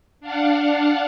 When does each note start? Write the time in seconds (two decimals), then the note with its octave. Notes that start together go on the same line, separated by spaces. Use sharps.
0.21 D4 F5 F#5